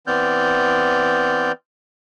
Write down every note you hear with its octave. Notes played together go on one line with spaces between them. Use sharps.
E3 B3 C4 D5 F6 G6